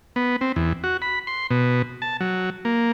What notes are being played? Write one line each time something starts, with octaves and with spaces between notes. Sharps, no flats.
B3
C4
E2
F#4
B5
C6
B2
A5
F#3
A#3